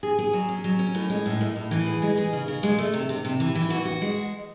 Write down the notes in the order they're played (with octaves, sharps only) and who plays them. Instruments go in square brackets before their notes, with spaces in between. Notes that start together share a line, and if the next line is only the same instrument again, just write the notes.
[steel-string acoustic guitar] G#4
G#4
F#3
C#4
F#3
C#4
A2
G#3
A2
A2
A2
E3
G#4
G#3
G#4
C#3
C#3
G#3
A3
C3
C3
C3
E3
E3
F#4
F#4
G#3